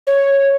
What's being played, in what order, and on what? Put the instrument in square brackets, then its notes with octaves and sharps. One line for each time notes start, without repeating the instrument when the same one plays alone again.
[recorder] C#5